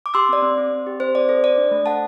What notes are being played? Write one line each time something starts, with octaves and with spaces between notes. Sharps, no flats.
D6
G4 C6 E6
C4 D5
C4
C4
C4
G4
C4 C5
C4 D5
A4 C5
A4 D5
D4
A3
A4 F#5 A5